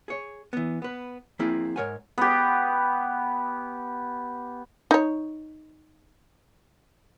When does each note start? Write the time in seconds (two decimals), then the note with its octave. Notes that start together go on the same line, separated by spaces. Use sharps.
0.08 G#4 C#5
0.53 E3 B3
0.82 B3 B4
1.39 F3 A#3 C4 E4 G#4
1.76 G#2 A#4 C#5 F#5 G#5
2.18 B3 G4
4.91 D#4 C#5